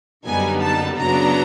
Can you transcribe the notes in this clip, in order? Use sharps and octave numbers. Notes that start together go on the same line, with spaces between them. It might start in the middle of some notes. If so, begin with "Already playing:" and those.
F#2 D3 G3 B3 D#4 G#5
A5
F#2 C#3 F#3 B3 D4 A#5